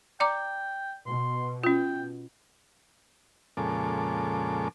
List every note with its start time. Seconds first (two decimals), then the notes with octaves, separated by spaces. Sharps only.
0.20 D5 G5 A#5 D6
1.07 B2 C6
1.64 C#4 F4 G5
3.57 F2 A#2 C#3 G#3 A4 D6